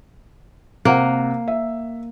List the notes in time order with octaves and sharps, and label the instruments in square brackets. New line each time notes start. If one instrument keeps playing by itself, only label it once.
[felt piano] C3 F#5 [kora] A#3
[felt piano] E5